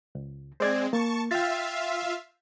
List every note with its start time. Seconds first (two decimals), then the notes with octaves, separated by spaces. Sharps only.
0.15 C#2
0.60 G#3 C4 C5 D5 G#6
0.93 A#3 A5 C#6
1.31 F4 E5 F5 G5 A6